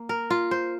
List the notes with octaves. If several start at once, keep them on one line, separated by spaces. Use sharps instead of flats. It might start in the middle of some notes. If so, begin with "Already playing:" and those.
Already playing: A#3
A#4
F4
C5